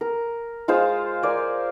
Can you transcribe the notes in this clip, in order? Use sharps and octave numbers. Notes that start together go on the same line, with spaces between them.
A#4
G#3 F4 C5 F5
A#4 D5 G#5